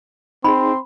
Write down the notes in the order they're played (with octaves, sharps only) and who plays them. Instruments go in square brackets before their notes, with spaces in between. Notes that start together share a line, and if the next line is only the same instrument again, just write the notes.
[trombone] C4 [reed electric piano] D#4 G#4 [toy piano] B5 [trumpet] C6